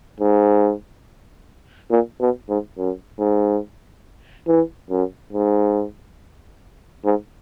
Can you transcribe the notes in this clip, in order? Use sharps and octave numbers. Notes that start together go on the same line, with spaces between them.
G#2
A#2
B2
G#2
F#2
G#2
E3
F#2
G#2
G#2